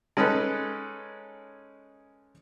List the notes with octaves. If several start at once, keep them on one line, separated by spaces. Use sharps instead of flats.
G#3 C#4 D#4 A4 B4